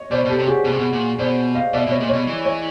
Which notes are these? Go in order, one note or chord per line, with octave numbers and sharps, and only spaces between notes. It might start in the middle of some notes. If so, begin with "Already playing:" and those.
Already playing: C#5 D#5
B2 C5 D5
B2
G4 A4
C3
F#4 G#4
B2
C3
B2
A#2
B2 C5 D5
D#5 F5
B2 D5 E5
B2
C#5 D#5
A#2
B2 C#5 D#5
E3
C#5 D#5